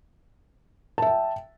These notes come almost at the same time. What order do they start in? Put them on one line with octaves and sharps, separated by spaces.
A5 E5 G5